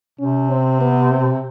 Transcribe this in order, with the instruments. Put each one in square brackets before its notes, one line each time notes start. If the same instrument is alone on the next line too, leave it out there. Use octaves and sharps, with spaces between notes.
[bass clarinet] C3 [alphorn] C#4
[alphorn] C4
B3
C4